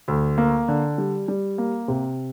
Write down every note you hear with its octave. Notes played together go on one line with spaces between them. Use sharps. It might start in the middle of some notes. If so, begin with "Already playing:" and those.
D2
A#3
D3
G3
G3
A#3
C3